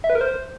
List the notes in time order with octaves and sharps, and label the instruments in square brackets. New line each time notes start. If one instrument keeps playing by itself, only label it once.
[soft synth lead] E5
B4
A#4
C5